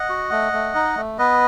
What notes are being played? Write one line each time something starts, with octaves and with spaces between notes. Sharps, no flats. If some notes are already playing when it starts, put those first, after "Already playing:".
Already playing: D#5 F#5
F#4
A3
A3
D#4
A3
B3 B4 D#5